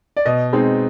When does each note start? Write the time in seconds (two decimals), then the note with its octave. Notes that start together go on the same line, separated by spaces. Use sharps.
0.17 D5
0.25 B2 D#5
0.53 G#3 C4 D#4